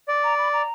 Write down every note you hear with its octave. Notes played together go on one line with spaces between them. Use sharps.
D5
A#5
B5
A#5